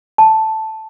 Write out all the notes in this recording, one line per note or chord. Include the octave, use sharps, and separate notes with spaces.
A5